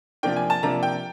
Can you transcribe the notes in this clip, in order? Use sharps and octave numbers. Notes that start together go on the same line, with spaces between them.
C3 F3 A#3 D4 G5
G#5
A5
C3 F3 A#3 D4 A#5
G5